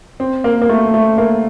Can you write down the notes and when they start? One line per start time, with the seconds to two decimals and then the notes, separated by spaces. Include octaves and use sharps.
0.20 C4
0.44 A#3
0.62 A#3
0.69 A3
0.94 A3
1.18 A#3